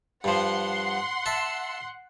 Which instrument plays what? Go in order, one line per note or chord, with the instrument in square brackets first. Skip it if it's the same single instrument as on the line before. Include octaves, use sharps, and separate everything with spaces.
[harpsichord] G2 F3 [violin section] F#5 C6
[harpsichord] E5 A5